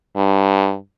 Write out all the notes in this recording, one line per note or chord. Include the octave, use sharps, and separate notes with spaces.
G2